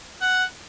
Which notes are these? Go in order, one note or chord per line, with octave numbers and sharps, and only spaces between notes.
F#5